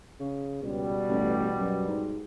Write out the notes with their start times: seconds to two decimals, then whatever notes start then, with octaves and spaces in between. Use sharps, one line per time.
0.20 C#3
0.62 C#2 B2 G3
1.09 A1
1.58 F#2
1.88 G#2